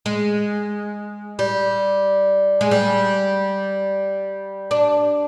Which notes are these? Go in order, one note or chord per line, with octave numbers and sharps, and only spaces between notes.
G#3
G3
G#3
G3
D4